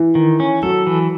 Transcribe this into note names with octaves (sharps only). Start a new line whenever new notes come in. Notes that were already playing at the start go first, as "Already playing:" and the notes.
Already playing: E3
D#3
C#4
F#3 A4
E3